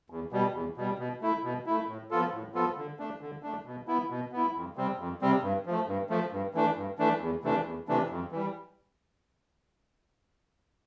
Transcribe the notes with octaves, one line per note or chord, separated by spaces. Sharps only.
E2
B2 G3
E2
B2 G3
B2
A3 E4
B2
A3 E4
A2
F3 B3 F4 A4
A2
F3 B3 F4 A4
D3
A3 D4
D3
A3 D4
B2
B3 E4
B2
B3 E4
F2
C3 G3 C4
F2
C3 G3 C4
G2
F3 A3
G2
F3 A3
G2
E3 A3 D4
G2
E3 A3 D4
E2
C3 E3 A3 D4
E2
C3 E3 A3 D4
F2
E3 G3